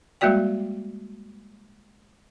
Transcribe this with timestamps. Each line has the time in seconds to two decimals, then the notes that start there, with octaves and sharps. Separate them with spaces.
0.21 G3 G#3 A#3 F#4 D5 G5